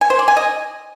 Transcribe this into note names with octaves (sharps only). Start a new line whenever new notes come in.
G#5
C5
D5
G#5
D#5